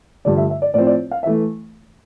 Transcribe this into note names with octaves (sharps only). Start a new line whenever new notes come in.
G2 D3 F3 A3 D5
E5
E5
D5
A2 F3 C4 D5
D5
F5
E3 A3 E5